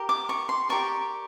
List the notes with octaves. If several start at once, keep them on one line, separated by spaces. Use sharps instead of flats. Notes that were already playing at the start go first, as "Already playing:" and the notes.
Already playing: G4 A#4
D6
C#6
C6
G4 A#4 D5 C#6